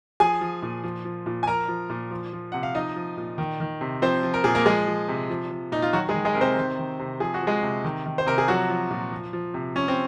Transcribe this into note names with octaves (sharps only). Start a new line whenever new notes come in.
F3 G#4 G#5
F3
A#2
F3
F3
A#2
G#5
F3 A#4 A#5
F3
A#2
F3
F3
C3 F#5
F5
F3 D#4 D#5
F3
A#2
D#3
D#3
C3
F3 C4 C5
F3
A#4
A#2 G#4
A#3 A#4
F3 G#3 G#4
F3
C3
F3
F3
A#2 D#4
F4
D#3 F#3 F#4
G#3 G#4
D#3
G#3 G#4
C3 A#4
C4 C5
D#3
D#3
C3
F3 G#4
F#4
F3
G#3 G#4
C3
D#3
D#3
C5
C3 A#4
G#4
F3 F#3 F#4
F3
A#2
F3
F3
C3
F3 C#4
C4